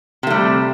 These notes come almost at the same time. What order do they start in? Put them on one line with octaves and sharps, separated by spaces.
C3 A3 G3